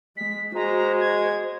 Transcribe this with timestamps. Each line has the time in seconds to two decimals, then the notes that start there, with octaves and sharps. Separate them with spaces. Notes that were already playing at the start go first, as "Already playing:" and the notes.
0.17 G#3 B6
0.55 G#3 F#4 C5 A#5
1.00 G#6